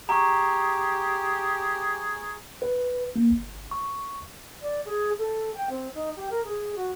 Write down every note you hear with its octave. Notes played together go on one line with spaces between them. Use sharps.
G4 G#4 A#5 C#6
B4
A#3
G1
C#6
D5
G#4
A4
G5
C4
D#4
G4
A#4
G#4
F#4